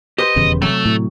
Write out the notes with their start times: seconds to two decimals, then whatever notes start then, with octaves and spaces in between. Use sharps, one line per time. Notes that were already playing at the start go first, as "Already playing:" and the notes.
0.18 G4 B4 C5 D#5
0.36 D#1 E2 C#3
0.62 C3 F#3 A3
0.86 A2